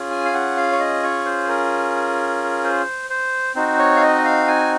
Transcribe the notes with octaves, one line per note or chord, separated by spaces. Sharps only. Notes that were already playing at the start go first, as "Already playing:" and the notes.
Already playing: C#4 F4 G#4
G#5
F5
F#5
F5
C#5
D#5
C#5
C5
A#4
C5
C5
C4 D#4 F#4 C5
C#5
F5
D#5
F5
G#5